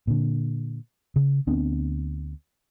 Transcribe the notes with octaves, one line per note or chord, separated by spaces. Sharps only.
A#2 D3
C#3
D2 B3 C4 D4